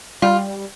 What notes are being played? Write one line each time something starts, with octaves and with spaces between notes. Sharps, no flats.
G3 F4